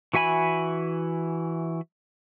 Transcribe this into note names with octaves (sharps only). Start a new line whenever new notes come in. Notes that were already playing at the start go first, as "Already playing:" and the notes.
E3 F#4 E5 G#5 B5